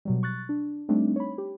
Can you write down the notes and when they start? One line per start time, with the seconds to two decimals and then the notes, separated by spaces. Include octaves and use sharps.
0.05 B2 F#3 G3
0.23 C#6 F#6 A6
0.49 D4
0.89 G3 A3 C4 D4 D#4
1.16 C#5 B5
1.38 G4